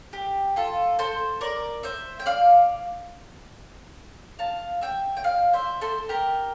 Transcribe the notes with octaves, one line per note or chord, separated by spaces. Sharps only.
G4
F4 A4
A4 C5
A#4 D5
C5 E5
G5
D5 F5
F5 A5
E5 G5
G5
D5 F5
C5 E5
A4 C5
G4 A#4